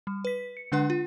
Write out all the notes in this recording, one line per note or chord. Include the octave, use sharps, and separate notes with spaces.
G3
B4 B6
C#7
D3 G#3 D4 B4 F#5
F4